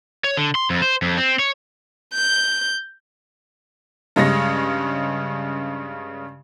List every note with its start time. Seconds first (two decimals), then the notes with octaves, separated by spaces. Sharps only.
0.24 C#5
0.37 D3
0.55 C6
0.70 F2
0.82 C5
1.02 F2
1.18 C4
1.39 C#5
2.14 G6
4.16 G2 C#3 G#3 C#4 A#6